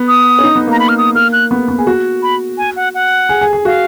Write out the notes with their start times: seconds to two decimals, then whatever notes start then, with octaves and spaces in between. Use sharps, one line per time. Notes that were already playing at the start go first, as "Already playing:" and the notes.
Already playing: B3
0.08 D#6
0.39 C#4
0.44 D#4
0.55 B3
0.67 A#3 A#5
0.80 B5
0.89 F6
0.98 D#6
1.15 A#3 F6
1.33 F#6
1.51 B3
1.68 B3
1.79 G#4
1.87 F#4
2.23 B5
2.58 G#5
2.76 F#5
2.95 F#5
3.29 G#4
3.41 G#4
3.53 G#4
3.65 F#4 F5